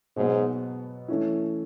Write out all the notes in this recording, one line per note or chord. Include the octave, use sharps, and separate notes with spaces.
G#2 B2 F#3 B3
E3 A3 C#4 E4